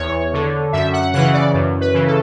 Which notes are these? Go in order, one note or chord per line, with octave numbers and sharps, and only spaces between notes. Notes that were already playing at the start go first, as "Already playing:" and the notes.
Already playing: E2 C#5
D3
F#2 E5
F#5
C#3 E3 F#5
D5
F#2
B4
C#3 E3
A4